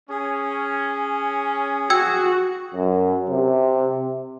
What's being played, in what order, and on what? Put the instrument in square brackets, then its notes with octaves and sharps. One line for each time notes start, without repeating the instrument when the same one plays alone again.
[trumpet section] C#4 [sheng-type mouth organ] G#4
[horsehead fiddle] F#4 [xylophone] G5 E6 G#6
[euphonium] F#2
C3